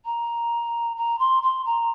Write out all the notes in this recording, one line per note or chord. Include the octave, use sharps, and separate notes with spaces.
A#5
A#5
C6
C6
A#5